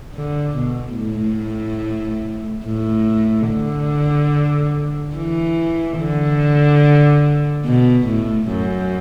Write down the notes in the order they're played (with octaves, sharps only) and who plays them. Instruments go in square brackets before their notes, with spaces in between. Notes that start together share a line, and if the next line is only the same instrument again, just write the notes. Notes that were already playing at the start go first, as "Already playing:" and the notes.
[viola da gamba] D3
B2
A2
A2
D3
E3
D3
B2
A2
F#2